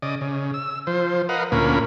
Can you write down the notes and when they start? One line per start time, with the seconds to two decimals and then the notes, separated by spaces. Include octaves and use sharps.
0.02 C#3 D5 D#5
0.21 C#3
0.54 E6
0.87 F3 C5
1.29 A#4 B4 D#5 F5 F#5
1.52 D2 A#2 A#3 C#4 B5